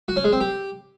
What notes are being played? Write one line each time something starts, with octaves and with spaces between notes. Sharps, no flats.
F#4
C#4
G#3
C4
G4